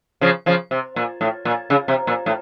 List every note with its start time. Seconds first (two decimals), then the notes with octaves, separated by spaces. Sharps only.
0.21 C#3 F3
0.46 C#3 F3
0.71 C3
0.96 A#2
1.21 A2
1.45 A#2
1.70 C#3
1.88 C3
2.07 A#2
2.26 A2